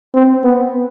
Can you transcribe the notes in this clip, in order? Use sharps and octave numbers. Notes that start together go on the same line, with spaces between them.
C4
B3